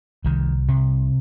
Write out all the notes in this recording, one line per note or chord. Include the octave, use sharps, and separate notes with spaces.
C2 D#3
C3